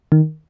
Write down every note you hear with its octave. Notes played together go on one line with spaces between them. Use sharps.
D#3